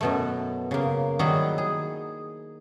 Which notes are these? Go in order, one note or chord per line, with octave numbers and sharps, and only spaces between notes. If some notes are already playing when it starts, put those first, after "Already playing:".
F#2 B2 A3
C#3 A#3
D#3 F#3 G3 E4 G#4
G#4